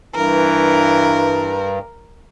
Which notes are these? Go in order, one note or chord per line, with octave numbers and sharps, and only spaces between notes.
G2 E3 A#4